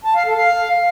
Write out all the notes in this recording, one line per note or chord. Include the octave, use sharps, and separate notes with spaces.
A5
F5
A4
F5